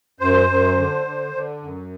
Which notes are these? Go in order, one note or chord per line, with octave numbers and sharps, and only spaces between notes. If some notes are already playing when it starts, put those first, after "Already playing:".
F#2 C5
F#2
D3
D3
D3
F#2